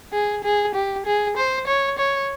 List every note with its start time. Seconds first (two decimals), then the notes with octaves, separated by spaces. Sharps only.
0.13 G#4
0.44 G#4
0.75 G4
1.06 G#4
1.37 C5
1.67 C#5
1.98 C#5